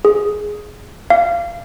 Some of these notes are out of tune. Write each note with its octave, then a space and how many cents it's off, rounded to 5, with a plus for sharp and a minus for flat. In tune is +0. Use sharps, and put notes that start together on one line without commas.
G#4 +10
F5 -25